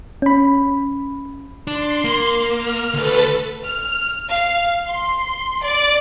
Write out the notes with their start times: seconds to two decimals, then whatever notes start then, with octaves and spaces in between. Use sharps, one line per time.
0.22 C#4 B5
1.67 D4 C6
2.04 A#3
2.49 F6
2.94 D2 A4 B4 A6
3.65 F6
4.30 F5
4.86 C6
5.63 D5